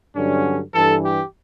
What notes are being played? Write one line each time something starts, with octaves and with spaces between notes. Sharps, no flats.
G2 D3 F#3 C#4
G2 E3 A4
G4